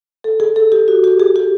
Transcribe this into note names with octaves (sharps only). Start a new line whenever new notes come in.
A4
G#4
A4
G4
F#4
G4
G#4
G4